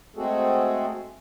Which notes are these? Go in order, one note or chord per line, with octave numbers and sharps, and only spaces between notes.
G#3 A3 C4 F#4 G#4 A4